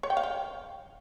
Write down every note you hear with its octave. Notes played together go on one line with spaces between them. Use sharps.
C#5
G5
F5
G5